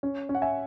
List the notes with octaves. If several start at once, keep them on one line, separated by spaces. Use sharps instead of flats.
C#4
C#4
F#5
E5 G#5